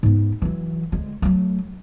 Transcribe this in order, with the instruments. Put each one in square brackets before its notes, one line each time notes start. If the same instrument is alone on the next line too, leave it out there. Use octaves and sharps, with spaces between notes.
[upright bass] G#2 B3
E3 F#3
D2 G#3
F#3 A3